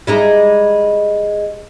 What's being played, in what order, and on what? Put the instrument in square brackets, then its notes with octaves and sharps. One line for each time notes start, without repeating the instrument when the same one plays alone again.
[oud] G3 G#3 D#4